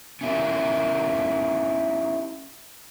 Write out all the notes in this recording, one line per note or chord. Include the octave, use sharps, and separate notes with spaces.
C#4 D#4 E4 F#4 G4 A#4